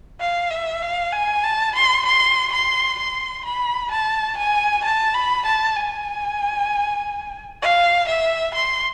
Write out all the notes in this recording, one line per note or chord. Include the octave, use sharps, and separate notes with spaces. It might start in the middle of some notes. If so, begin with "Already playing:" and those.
F5
E5
F5
G#5
A5
C6
C6
C6
C6
B5
A5
G#5
A5
B5
A5
G#5
F5
E5
C6